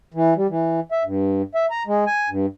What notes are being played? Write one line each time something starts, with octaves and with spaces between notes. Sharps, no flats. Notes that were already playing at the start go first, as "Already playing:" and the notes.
E3
G3
E3
E5
G2
E5
A#5
G#3
G#5
G2